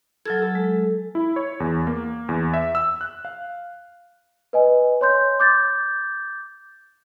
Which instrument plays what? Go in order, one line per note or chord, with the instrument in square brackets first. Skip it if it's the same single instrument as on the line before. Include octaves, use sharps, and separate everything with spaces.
[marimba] F#3 F6 G#6 [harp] A4
[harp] A4
[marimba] G#3
[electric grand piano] E4
C#5
E2
A#3
E2
E5
E6
F#6
F5
[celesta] B4 D#5 G#5
C#5 C6 G6
D6 G6 A6